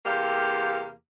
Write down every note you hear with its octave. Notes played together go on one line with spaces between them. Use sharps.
E2 C3 A#3 G4 F5